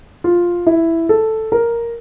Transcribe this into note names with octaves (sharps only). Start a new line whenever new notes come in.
F4
E4
A4
A#4